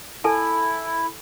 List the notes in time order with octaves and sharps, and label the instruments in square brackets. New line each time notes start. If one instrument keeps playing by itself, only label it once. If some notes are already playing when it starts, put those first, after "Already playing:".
[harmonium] E4 [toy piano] A4 G#5 A5